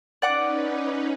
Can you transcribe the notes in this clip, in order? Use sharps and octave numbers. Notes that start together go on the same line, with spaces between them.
C#4 D#4 B4 D5 F#5 D6